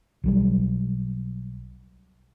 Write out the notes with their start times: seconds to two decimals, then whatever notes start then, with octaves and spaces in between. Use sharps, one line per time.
0.24 B1 F#3 G3